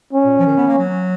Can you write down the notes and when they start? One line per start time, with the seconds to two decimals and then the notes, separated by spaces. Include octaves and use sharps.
0.13 C#4
0.25 A#2
0.39 F3
0.46 D#3
0.57 B3
0.67 A#3
0.78 F#3